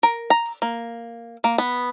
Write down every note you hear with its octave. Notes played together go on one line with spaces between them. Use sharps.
A#4
A#5
A#3
A#3
B3